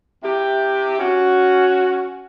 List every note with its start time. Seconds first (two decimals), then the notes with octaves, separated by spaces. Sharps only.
0.23 C3 E4 G4
0.99 C#4 F#4